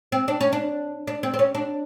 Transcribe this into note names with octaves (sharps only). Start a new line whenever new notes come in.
C4
D4
C#4
D4
D4
C4
C4
C#4
D4